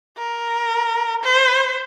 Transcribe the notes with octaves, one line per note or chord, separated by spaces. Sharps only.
A#4
C5